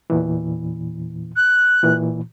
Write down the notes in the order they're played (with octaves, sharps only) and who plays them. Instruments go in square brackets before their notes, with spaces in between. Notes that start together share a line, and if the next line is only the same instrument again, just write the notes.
[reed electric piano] E2 A#2 E3
[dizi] F#6
[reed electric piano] A#2 E3